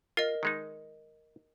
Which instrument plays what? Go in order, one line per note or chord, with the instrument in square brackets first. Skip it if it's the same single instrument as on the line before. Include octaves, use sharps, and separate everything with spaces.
[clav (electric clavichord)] F4 [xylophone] A#4 D#5
[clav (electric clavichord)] D#3 G#3 D#4